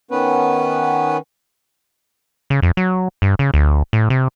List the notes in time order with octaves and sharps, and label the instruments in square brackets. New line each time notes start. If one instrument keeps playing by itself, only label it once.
[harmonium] D#3 B3 C#4 B4
[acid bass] C#3
F2
F#3
G2
C#3
D2
A2
C3